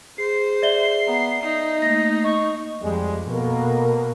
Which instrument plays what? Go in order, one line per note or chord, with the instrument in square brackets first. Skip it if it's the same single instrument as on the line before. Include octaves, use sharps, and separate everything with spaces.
[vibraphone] G#4 [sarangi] C5 [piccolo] C7
[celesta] D5 E5 G7
[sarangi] B3 [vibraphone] A#5
[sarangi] D#4
[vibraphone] A3 A#3 [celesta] A#6
[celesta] D#5 [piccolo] C#6
[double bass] F2 [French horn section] G3 G#3
[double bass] B2 A#3 [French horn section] B3 A4 A#4